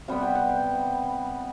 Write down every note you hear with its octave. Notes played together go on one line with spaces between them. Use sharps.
C3 G3 B3 F#5
G5
F#5
G5